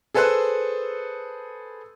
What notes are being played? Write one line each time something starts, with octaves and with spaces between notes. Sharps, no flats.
G#4 A4 B4 C5 E6 F#6